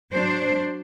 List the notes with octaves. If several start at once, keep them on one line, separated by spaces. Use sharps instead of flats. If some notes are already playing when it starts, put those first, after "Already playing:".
F#3 D4 C5